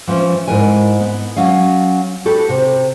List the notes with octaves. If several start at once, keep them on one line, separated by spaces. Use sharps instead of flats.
E3 F3 C#4
G#2 E4 A#4 B4 G#5
B3
F#3 C#4 F5
F#4 G4 A4 B4
C3